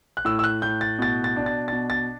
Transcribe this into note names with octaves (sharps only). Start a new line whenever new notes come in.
F#6
A2 E6
E6
F#6
A2 G6
A6
B2 A6
A6
D4
A6
B2 A6
A6